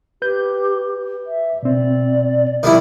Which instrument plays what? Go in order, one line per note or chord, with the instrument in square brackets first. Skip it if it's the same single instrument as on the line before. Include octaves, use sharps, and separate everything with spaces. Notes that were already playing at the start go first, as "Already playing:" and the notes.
[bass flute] G4 [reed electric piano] B4 G6
[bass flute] E5
[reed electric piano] B2 C4 [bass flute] D5
[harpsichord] D#3 G3 E4 [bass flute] F3